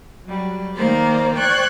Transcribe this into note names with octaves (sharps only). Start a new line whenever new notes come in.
F#3 G3
D#3 A#3 A#4 C5 D5
C5 D5 G5 C#6 F#6 G#6